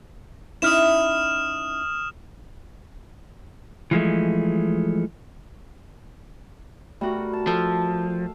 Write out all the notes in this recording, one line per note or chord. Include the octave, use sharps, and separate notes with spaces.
C#4 D#4 E4 D#6 F6 E7
E3 F3 G#3 A3
G3 A3 F#4 A#4
A5
F3 A4 F5